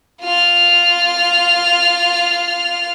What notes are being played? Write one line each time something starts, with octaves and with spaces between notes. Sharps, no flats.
F4 F6